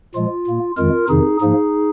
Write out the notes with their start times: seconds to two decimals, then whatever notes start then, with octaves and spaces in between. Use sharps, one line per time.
0.14 A#2 F3 G#3 F4
0.47 A#2 A#3
0.77 F2 D#3 G#3 F4 A#4
1.09 F2 C3 D#3 D#4 G#4
1.41 G#2 F3 A#3 D#4 G#4